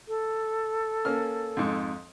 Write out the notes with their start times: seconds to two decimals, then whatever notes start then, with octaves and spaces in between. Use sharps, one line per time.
0.08 A4
1.05 A#3 C#4 F6
1.57 F2 G#2